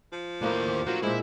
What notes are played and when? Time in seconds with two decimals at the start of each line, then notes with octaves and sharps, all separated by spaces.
0.12 F3
0.41 D#2 A2 A#3 D4 A#4 C5
0.68 G4
0.87 F#3 F4 A#4 C5
1.03 A#2 G#3 E4 C5